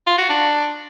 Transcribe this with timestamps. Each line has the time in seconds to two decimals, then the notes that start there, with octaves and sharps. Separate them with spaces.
0.07 F4
0.18 F#4
0.29 D4